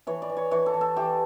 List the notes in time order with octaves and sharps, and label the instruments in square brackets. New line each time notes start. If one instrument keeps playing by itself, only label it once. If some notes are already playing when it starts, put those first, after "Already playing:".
[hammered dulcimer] E3 C#5
D5
E3
C#5
E3 C#5
A4
E3
A4
E3 G4